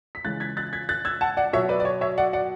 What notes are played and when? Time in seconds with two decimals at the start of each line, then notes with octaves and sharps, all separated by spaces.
0.15 B6
0.24 C#3 E3 G#3 F#6 A6
0.40 G#6 B6
0.57 F#6 A6
0.73 G#6 B6
0.89 F#6 A6
1.05 E6 G#6
1.21 F#5 A5
1.37 D5 F#5
1.53 B2 F#3 C#5 E5
1.69 B4 D5
1.80 D5
1.85 C#5
2.01 C#5 E5
2.18 D5 F#5
2.33 D5 F#5